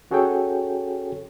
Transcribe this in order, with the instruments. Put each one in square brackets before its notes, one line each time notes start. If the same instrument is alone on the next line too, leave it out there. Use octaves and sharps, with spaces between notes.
[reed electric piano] C#4 F#4 G#4 A4 C#5 G5